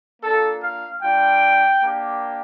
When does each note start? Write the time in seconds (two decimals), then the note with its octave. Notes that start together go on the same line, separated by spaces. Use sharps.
0.23 A#3 D4 F4 A4
0.63 F5
1.02 G3 D4 F4 G5
1.82 A#3 D4 G4